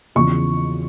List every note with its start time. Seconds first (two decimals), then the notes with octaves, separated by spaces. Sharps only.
0.15 E2 C#3 F3 C#6